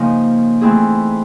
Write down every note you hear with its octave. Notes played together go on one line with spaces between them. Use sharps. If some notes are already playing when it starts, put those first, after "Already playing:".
Already playing: F2 C#3 F3 A#3 D#4
E3 A3 C4 E4 G#4